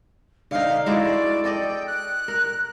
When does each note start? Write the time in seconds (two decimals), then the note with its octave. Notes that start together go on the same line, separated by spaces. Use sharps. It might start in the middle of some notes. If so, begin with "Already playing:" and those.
0.51 D3 D#4 F5
0.86 G#3 E4 F#4 D5
1.44 A4 D5 D#5 G5
1.87 F#6
2.28 A#4